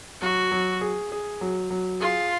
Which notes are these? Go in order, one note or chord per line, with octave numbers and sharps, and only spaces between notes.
F#3 F#4
F#3
G#4
G#4
F#3
F#3
F4 G#4